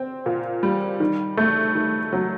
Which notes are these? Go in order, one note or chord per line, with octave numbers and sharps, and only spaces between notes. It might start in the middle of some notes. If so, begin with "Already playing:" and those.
Already playing: C4
A#2
G3
D#3
A3
D#3
F#3